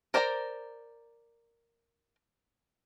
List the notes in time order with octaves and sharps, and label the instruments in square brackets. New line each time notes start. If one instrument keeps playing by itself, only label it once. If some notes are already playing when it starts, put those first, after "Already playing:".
[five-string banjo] A#4 C5 D5 A5 A#5